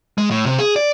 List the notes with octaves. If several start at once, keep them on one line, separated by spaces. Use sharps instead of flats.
G#3
A2
C3
G#4
D5